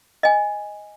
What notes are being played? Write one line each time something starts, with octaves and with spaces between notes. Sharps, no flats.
D#5 G#5